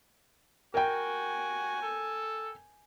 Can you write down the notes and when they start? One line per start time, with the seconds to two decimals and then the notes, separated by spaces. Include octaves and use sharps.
0.74 F#4 A#4 G5 G#5
1.82 A4